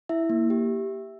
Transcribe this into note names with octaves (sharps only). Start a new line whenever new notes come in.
E4 E5
A#3
G4